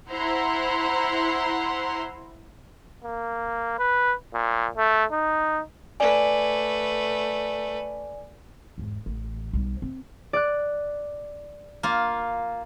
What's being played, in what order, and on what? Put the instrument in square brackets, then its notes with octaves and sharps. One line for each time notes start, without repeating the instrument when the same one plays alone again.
[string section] E4 C5 F#5 A#5 C6
[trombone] A#3
B4
A#2
A3
D#4
[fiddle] A3 B4 [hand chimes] D5 G#5
[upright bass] E2 G#2
A1
B1 G3
C4
[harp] D5 F#6
[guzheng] A#3 F4